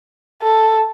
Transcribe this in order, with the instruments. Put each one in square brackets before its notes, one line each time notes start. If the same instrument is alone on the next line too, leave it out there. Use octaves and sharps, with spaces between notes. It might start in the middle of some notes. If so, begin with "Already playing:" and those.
[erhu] A4